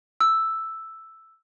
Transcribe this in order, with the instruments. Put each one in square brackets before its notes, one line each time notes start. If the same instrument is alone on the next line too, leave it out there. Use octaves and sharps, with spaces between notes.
[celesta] E6